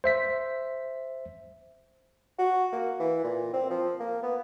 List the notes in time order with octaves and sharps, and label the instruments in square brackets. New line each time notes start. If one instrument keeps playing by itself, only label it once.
[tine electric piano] C5 E5 B6
[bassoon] F#4
A#3
E3
A#2
C4
F3
A#3
B3